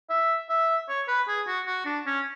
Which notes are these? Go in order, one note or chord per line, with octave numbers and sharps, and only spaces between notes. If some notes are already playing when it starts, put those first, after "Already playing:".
E5
E5
C#5
B4
G#4
F#4
F#4
D4
C#4